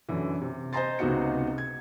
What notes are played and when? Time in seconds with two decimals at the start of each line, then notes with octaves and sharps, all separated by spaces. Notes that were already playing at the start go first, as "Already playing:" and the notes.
0.09 F#2 D3 E3
0.42 C3
0.73 C5 D#5 G#5 A#5 C6 A6
0.99 C#2 C3 B3 D#4 F#4 C#7
1.58 G#6